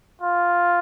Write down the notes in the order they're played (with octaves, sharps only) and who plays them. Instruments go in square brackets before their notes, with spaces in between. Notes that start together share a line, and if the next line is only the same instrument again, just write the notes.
[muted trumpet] F4